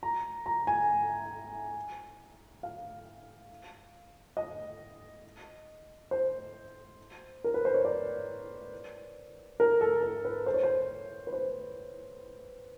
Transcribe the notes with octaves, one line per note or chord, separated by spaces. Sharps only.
A#5
A#5
G#5
F5
D#5
C5
A#4
B4
C5
C#5
D5
A#4
A4
A#4
B4
C5
C#5
C5
B4
C5